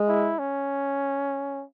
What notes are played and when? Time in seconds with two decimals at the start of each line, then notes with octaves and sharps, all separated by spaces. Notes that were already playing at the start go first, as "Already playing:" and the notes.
Already playing: G#3
0.08 E4
0.39 C#4